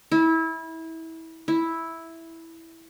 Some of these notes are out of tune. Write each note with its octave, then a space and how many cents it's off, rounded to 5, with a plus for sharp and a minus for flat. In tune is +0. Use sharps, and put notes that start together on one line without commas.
E4 -25
E4 -5